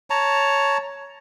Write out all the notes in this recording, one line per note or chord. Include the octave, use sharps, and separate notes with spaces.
C#5 A5 A#5